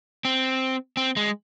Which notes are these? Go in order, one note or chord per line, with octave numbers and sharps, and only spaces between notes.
C4
C4
G#3